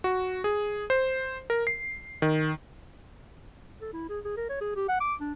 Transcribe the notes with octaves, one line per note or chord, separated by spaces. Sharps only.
F#4
G#4
C5
A#4
C7
D#3
A4
E4
G#4
G#4
A#4
C#5
G#4
G4
F#5
D6
D4